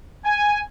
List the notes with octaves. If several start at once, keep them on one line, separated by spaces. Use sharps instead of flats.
G#5